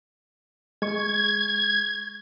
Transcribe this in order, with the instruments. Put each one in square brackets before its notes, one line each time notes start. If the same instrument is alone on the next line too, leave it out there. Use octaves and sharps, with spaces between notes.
[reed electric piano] G#3 C#6 [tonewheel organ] G#6